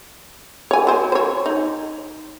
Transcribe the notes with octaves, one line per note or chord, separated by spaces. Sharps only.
C#5 G#5
F#3 C5
C5 C#5
D#4